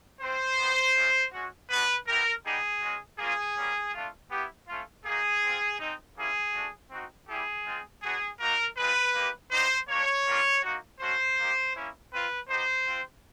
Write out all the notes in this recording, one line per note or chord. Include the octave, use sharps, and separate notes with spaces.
C4 F4 C5
B3 D#4 G4
G#3 C#4 F4
G#3 C#4 F#4
B3 D4 F#4 B4
B3 E4 G4 A#4
G3 B3 D#4 G4 G#4
G#3 C#4 F#4
A#3 C#4 F4 G#4
G3 A#3 C#4
A3 D4 F4
B3 E4 G4
A3 C#4 F4
A#3 D#4 F#4 G#4
C4 F4
G#3 C4 D#4
A#3 C#4 E4 G4 G#4
A3 D4 F#4
C4 D#4 F#4
G3 C4 E4 G4 G#4
G#3 C4 F4
B3 D4 F#4 G#4
A#3 D#4 F#4 A#4
G#3 C4 F4 B4
A#3 D#4 G4
G3 B3 D#4 C5
A#3 D4 G4 C#5
G3 A#3 D4 F4
A#3 D#4 F#4
A3 C#4 F#4 C5
A#3 D#4 G4
A#3 C#4 E4
C4 F4 B4
B3 D#4 G4 C5
C4 F4